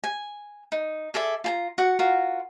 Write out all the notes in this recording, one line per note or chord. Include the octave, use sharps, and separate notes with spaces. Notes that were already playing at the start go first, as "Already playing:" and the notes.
G#5
D#4
G#4 A4 D5 E5
F4 G#5 A#5
F#4 F#5
F4 F#4 A#4